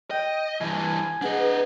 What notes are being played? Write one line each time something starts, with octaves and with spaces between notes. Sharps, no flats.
D#5 G5
G2 E3 G#5
D4 G#4 B4 D#5 F#5